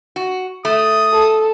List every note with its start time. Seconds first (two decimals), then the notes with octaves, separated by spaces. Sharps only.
0.16 F#4
0.65 A3 D#6
1.12 A4